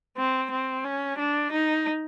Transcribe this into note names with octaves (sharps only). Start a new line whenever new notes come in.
C4
C4
C#4
D4
D#4